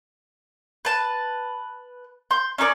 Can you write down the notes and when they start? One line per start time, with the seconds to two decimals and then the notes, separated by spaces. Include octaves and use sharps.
0.85 B4 A5
2.31 C6 G6
2.58 C#4 D#4 A4 D5